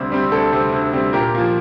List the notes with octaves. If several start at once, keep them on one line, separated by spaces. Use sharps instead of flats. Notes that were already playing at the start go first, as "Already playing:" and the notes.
Already playing: D2 C3 G3 C4 G4
C3 G3 C4
D2 A4
C3 G3 C4
D2
C3 G3 C4
A#2 G4 A#4
F3 A#3